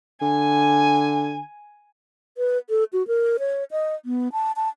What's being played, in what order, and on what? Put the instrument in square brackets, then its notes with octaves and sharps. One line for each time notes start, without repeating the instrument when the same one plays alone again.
[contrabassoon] D3 [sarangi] G#5
[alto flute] B4
A4
F#4
A#4
C#5
D#5
B3
A5
A5